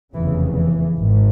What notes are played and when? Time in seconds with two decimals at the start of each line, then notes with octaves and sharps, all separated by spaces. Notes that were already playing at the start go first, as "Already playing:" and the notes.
0.14 F1 E2 C#3 E3
0.56 E3
0.98 G#1 G#2